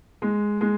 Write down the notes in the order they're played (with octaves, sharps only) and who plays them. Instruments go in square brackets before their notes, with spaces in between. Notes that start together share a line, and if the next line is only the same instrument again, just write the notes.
[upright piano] G#3
G#3